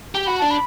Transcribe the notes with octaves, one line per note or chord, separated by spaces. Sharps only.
G4
F#4 B5
D4 A5
B5